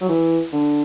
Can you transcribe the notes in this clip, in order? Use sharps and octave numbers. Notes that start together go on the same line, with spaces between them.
F#3
E3
D3